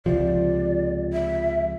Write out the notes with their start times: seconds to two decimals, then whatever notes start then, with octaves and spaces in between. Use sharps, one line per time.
0.06 C#2 C3 F3 D5
1.13 E5